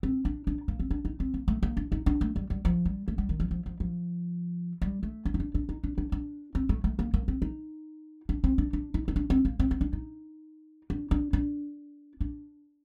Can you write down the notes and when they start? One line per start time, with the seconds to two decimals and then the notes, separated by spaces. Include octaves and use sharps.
0.03 C4
0.25 D4
0.47 D4
0.68 A#3
0.80 C4
0.91 D4
1.05 D#4
1.20 C4
1.34 A#3
1.48 A3
1.63 A#3
1.77 D4
1.92 D#4
2.06 D4
2.21 A3
2.36 G3
2.50 G3
2.65 F3
2.85 G3
3.08 A3
3.18 G3
3.29 D#3
3.40 F3
3.51 F3
3.66 F3
3.80 F3
4.82 G3
5.03 A3
5.25 D4
5.34 D#4
5.40 D4
5.54 D4
5.69 D#4
5.83 D4
5.98 D4
6.12 D4
6.55 C4
6.69 A3
6.84 A3
6.99 A#3
7.14 A#3
7.28 C4
7.42 D#4
8.29 D4
8.44 C4
8.58 D4
8.73 D4
8.94 D#4
9.08 D#4
9.16 D4
9.30 C4
9.45 A#3
9.59 C4
9.71 C4
9.81 D4
9.93 D#4
10.90 D4
11.11 D4
11.33 D4
12.21 D4